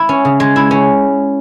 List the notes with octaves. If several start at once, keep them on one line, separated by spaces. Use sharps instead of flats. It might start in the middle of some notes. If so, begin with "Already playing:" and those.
Already playing: E4
C#4
C#3
G#3
E4
C#4